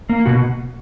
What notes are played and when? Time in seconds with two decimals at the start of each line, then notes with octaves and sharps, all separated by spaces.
0.09 A#3
0.26 B2 F#4